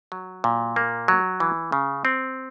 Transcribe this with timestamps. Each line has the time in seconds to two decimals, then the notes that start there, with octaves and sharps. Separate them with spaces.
0.12 F#3
0.44 A#2
0.76 A#3
1.08 F#3
1.40 E3
1.72 C#3
2.05 C4